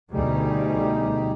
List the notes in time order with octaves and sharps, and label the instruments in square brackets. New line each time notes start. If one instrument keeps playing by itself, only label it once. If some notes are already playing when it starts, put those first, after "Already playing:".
[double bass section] D2 B2 G3 [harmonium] D#4 G4 G#4